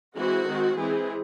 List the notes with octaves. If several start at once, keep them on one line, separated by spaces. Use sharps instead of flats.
E3 G#3 C4 F#4
D#3 G#3 C4
E3 G#3 C4 G#4